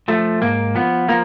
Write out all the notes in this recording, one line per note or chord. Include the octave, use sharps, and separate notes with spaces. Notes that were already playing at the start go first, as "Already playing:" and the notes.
F3 A3
G#2 A#3
F3 B3
F3 A#3